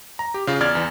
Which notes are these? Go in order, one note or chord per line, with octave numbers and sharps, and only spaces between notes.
A#5
G4
C#3 F4
E2 D5 F6 G#6 A6
E2 E3